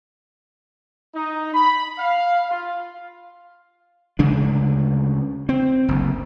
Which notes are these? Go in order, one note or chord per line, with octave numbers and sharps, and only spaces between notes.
D#4
B5
F5
F4
D2 C#3 G#3 D4
C4
F#1 D2